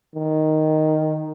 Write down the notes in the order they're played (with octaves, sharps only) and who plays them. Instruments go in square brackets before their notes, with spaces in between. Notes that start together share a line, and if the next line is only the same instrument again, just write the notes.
[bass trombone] D#3